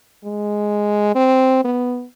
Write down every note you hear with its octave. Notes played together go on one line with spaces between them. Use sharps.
G#3
C4
B3